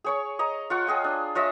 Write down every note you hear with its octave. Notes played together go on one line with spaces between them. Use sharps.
G#4 C#5 C#6
D#5 A#5 D#6
F4 F#5 C#6
G#4 D#5 G5
D4
F4 C#5 D#5 E5